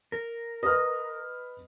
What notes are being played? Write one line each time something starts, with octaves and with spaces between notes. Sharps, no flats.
A#4
B4 D#5 F6